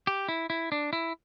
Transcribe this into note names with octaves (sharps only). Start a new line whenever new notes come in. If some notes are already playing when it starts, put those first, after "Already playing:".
G4
E4
E4
D4
E4